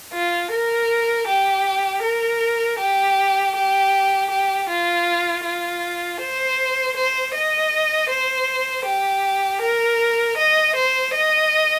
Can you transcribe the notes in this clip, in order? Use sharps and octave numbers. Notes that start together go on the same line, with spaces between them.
F4
A#4
G4
A#4
G4
G4
G4
F4
F4
C5
C5
D#5
C5
G4
A#4
D#5
C5
D#5